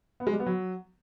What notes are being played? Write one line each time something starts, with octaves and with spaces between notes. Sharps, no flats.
B3
G#3
G3
B3
F#3